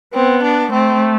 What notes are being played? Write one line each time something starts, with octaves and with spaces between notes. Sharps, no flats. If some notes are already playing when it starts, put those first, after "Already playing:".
B3 C4
D4
A3 C4